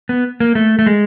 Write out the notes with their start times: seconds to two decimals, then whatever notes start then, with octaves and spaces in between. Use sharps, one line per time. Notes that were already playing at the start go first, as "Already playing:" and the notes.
0.09 B3
0.40 A#3
0.55 A3
0.79 A3
0.86 G#3